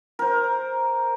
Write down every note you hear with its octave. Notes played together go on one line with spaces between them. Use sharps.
A#4 C5